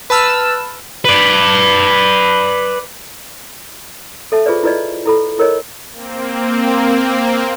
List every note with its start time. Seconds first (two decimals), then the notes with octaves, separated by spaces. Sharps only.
0.10 B4 A5 E6 F6
1.05 B4 D5
4.32 A4 E5 A5
4.46 F4 G#4 B4 C5 D5
4.63 E4 F4 B4 D5 D#5
5.06 E4 A4 B5
5.39 E4 A#4 C#5 D#5
5.92 A#3 C4